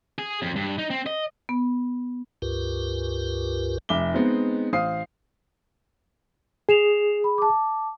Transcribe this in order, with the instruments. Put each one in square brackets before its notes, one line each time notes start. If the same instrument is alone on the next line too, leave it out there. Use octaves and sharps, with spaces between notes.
[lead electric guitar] G#4
F2
G2
D#4
C4
D#5
[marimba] B3
[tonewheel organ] C#2 G2 F4 G4 A#4 B4
[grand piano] F1 E5 D6 G7
G#3 B3 C4 D#4
A1 C5 F5 D#6 C7
[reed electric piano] G#4 [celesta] C7 E7 F7
[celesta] B5
A5 D6